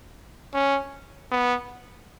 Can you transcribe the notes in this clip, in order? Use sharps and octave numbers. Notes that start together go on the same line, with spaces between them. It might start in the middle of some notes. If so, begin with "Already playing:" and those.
C#4
B3